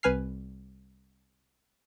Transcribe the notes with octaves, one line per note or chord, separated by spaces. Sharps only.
C2 B4 G#5 F6 C7